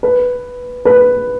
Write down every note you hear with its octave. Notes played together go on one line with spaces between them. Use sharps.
B4
B4